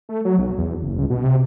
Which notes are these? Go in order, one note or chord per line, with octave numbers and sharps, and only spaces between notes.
A3
F#3
B1
E2
F#1
C#2
B2
C3